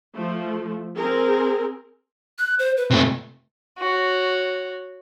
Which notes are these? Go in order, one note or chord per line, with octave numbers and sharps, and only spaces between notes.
F3 A3
C4 G#4 A#4
F#6
C5
B4
C3 A3
F#4 C#5